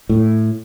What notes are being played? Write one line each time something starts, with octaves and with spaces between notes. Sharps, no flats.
A2